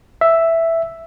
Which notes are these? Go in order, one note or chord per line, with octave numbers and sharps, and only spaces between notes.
E5